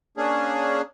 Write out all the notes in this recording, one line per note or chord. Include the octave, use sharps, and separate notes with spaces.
A#3 C#4 D4 G#4